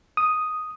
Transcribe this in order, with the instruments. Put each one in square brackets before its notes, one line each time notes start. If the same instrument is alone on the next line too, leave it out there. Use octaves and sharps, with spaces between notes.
[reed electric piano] D#6